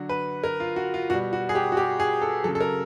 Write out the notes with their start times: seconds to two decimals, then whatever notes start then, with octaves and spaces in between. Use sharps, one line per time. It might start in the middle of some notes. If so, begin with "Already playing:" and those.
Already playing: D3 F#3 F#4
0.09 B4
0.44 A#4
0.60 F4
0.76 F#4
0.94 F4
1.10 B2 G3 F#4
1.33 F#4
1.49 G#4
1.55 G4
1.72 F#4
1.77 G4
2.00 G#4
2.22 A4
2.44 F#3 A4
2.48 C#3
2.55 A4
2.61 A#4